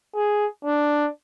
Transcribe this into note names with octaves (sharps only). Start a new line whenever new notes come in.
G#4
D4